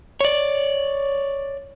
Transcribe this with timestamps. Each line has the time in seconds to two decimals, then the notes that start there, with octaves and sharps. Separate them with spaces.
0.21 C#5 D5